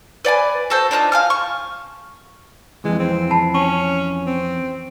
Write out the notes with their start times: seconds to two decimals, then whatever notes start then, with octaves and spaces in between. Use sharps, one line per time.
0.25 B4 D5 F#5 G#5
0.70 F#4 A4 C5
0.91 D4 D#4 F4 A5
1.12 F5 G#5 F6
1.30 C#6
2.85 F2 E3 G#3
2.99 C4
3.31 A5 B5 C7
3.54 C#4 C#6
4.27 C4